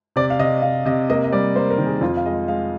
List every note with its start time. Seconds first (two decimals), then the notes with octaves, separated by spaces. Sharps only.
0.16 C3 D5
0.30 F5
0.39 C3 D#5
0.62 C3 F5
0.85 C3 D#5
1.10 A#3 D#5
1.24 D#5
1.32 G3 D5
1.56 A#3 C5
1.70 A#4
1.78 D#3
1.86 G#4
2.01 F2 F4
2.17 F5
2.25 G#3 D#5
2.48 G#3 F5